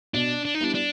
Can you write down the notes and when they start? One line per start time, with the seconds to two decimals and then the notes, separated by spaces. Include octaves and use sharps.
0.14 B2 D4
0.45 D4
0.55 D#4
0.61 G3 B3 D4 E4
0.75 D4